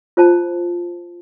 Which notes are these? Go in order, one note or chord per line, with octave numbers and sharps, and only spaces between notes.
F4 C5 A5